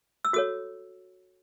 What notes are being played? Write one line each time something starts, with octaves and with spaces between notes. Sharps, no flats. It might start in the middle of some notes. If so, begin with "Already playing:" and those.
E6
F#4 A4 C#5 D#6